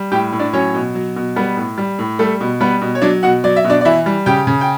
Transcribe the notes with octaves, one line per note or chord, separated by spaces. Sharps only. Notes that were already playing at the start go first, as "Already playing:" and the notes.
Already playing: G3
A2 G4 G5
A2
D4 D5
F#3 C#4 C#5
B2
F#3
B2
G3 B3 B4
A2
G3
A2
G3 A3 A4
B2
G3 B3 B4
B2
C#5
F#3 D4 D5
B2 F#4 F#5
F#3 D5
E5
B2
D4 D5
D5
E3 E4 E5
G3
C#3 G4 G5
C#3
G5